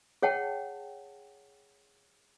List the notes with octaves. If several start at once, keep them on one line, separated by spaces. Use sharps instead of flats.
G#4 C#5 F#5 G5 A5